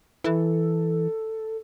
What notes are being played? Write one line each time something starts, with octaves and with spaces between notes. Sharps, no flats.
E3 A4